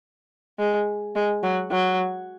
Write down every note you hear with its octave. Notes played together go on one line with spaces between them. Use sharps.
G#3
G#3
F#3
F#3